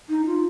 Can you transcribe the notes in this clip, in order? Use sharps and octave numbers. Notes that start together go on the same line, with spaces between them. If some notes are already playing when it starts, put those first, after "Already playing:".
D#4
F4